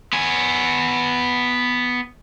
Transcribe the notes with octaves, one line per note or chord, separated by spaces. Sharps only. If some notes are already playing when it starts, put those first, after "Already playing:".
B3 G#5